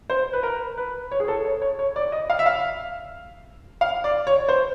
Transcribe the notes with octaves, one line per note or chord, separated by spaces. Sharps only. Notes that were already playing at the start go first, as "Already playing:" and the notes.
C5
B4
A#4
B4
C#5
G#4
A4
C#5
C#5
C#5
D5
D#5
F5
E5
F5
F5
D5
C#5
C5